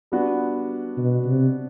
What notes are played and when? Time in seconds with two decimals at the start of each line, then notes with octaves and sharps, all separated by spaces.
0.12 G3 B3 D4 F#4
0.98 B2
1.26 C3